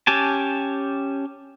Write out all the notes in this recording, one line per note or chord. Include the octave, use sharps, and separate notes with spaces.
C#4 G4 G#5 A5